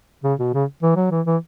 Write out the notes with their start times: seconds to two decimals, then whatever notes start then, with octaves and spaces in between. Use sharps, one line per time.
0.24 C#3
0.39 B2
0.54 C#3
0.83 E3
0.96 F#3
1.11 E3
1.26 E3